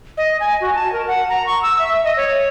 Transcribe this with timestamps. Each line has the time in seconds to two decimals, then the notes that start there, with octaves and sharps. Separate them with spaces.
0.17 D#5
0.40 G#5
0.61 F#4
0.75 A5
0.93 A#4
1.08 F#5
1.29 A#5
1.46 C#6
1.63 E6
1.79 E5
2.05 D#5
2.17 C#5